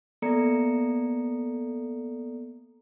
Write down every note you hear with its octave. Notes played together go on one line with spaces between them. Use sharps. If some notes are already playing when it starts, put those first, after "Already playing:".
A#3 B3 A4 D5 A#5 C#7